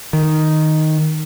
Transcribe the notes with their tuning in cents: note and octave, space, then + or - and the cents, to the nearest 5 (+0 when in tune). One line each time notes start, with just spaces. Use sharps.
D#3 +0